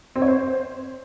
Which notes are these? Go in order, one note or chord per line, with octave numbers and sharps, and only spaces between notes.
C4
C#5
C5